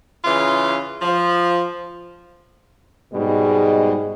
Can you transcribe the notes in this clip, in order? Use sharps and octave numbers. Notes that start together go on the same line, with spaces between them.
C#3 E3 F4
F3
G#2 B2 G3 G#3